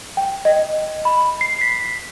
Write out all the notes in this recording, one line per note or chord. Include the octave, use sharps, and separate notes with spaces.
G5
D#5
B5
C7
B6